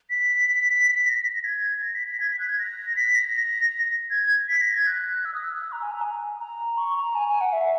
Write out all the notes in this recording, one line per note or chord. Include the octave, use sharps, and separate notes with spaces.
B6
A#6
G#6
A#6
B6
B6
G#6
B6
F#6
G#6
A#6
B6
A#6
G#6
G#6
B6
A#6
G#6
F#6
E6
D#6
E6
F#6
E6
A#5
G#5
A#5
G#5
A#5
C#6
A#5
G#5
G#5
F#5
E5